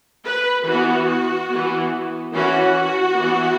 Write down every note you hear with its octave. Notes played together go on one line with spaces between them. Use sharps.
B4
E3 B3 F#4
E3 B3
E3 C#4 F#4
E3 B3